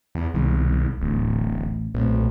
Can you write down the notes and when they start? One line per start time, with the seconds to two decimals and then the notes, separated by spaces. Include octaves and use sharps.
0.15 E2
0.34 C2 B2 D#3 G#3
1.01 D1 A1
1.94 B1 A#2 A3 C4